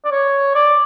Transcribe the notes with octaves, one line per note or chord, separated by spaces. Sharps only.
D5
C#5
D5